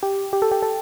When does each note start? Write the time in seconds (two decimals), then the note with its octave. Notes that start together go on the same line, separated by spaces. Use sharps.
0.03 G4
0.33 G4
0.42 A4
0.51 G4
0.62 A4